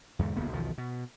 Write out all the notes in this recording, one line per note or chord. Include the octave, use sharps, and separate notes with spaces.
E2 G#2 D3
D#1 C#2 A#3 B3
B1 E2 D#3 F3
B2